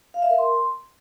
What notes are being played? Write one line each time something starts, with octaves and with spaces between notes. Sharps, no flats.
F5
E5
A#4
C6